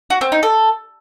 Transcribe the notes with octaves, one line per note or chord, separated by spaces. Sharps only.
F#4
C4
D#4
A4